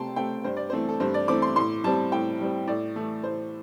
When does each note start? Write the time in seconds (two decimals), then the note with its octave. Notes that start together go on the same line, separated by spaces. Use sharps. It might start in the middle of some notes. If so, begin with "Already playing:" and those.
Already playing: C3 A3 C4 G5 A5 C6
0.16 A3 C4 G5
0.44 G2 C5
0.57 D5
0.70 E3 A3 C4 C5
0.89 A4
1.00 G2 C5
1.14 D5
1.28 E3 A3 C4 D6
1.42 C6
1.56 A2 C6
1.84 G3 C4 A5
2.12 A2 G5
2.40 G3 C4
2.68 A2 D5
2.95 E3 A3
3.23 A2 C5